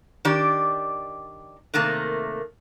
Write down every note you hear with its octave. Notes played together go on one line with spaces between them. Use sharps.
D#3 D4 G4 D5
C3 D#3 A3 A#3